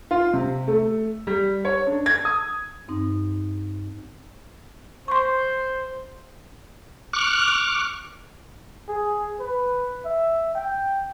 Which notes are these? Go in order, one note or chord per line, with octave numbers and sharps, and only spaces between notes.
F4
C3
A3
G3
C#5
D4
G#6
D#6
G2 C4 D#4
C5 C6 C#6
C#6 D6 F6 F#6
G#4
B4
E5
G5